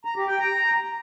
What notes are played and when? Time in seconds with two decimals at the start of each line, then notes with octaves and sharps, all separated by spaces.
0.05 A#5
0.16 G4
0.28 G5
0.40 A#5